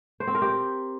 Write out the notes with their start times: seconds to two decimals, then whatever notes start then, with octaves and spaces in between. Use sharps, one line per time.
0.20 C5
0.27 C4
0.35 A#4
0.42 G4